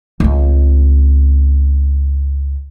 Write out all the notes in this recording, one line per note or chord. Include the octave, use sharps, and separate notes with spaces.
C#2 C4